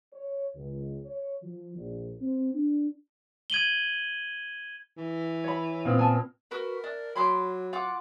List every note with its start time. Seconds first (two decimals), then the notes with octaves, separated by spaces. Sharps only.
0.13 C#5
0.55 C#2
1.05 C#5
1.42 F3
1.76 A#1
2.21 C4
2.54 D4
3.50 G#6 D#7 F#7 G7
4.97 E3
5.44 C#5 B5
5.85 A#2 B3 C4
5.98 B4 G#5 A5
6.51 F#4 A#4 B4
6.84 D4
7.16 F#3 B5 C6 D6
7.73 F4 F#5 D6